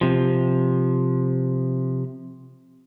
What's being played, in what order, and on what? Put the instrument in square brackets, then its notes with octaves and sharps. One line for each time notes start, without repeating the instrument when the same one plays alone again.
[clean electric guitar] C3 F3